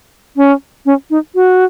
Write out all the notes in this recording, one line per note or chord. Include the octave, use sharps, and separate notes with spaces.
C#4
C#4
D#4
F#4